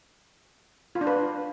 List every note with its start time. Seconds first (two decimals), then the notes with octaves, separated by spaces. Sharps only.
0.95 F4
1.01 D4
1.07 B4